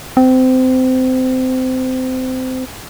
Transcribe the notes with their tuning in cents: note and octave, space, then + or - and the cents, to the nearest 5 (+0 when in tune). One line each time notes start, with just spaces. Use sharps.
C4 -25